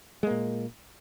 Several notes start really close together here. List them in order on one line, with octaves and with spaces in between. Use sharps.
G#3 A#3 A#2